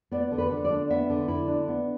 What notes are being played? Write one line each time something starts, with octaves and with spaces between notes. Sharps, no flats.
B3 D5
D3
B4
D3
D5
D4
B3 E5
D3
D3 E4
D4
B3